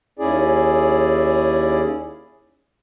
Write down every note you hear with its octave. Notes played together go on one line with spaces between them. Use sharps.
D#2 C#4 E4 G#4 D5